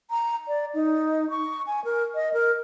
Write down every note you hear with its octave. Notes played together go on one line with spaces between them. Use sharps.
A#5
D5
D#4
C#6
G#5
A#4
D#5
A#4